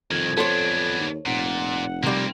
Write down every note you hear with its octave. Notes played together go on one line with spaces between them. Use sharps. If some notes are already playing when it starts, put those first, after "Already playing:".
C2 F2 D#3 G#6
B3 D4 A4 C5 C#5
D#2
F1 A#2 F#5
C3 G3 A#3 C4